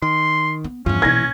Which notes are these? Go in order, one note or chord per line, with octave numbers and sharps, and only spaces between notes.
D#3 C6
B3
E2 G2 F3 C#4
A#1 B2 E3 G#6 A#6